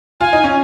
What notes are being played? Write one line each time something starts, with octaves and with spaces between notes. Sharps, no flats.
F4 G#5
D#4
C#4